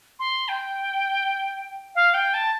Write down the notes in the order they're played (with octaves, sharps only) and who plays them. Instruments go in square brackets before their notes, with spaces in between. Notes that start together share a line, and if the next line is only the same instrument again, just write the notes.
[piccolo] C6
G5
F5
G5
A5